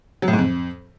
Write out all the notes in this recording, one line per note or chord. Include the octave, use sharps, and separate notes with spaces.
F#3
A2
G#2
F2